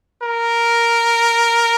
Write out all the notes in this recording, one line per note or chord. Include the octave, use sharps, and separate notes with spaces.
A#4